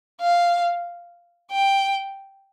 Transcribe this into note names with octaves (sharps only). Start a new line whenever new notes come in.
F5
G5